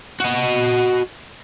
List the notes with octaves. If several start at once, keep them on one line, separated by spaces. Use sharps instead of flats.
F#4 D#5